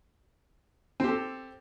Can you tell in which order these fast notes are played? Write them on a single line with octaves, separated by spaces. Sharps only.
C4 G4 A4